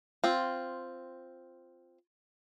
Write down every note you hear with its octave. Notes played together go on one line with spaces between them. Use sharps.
C4 F4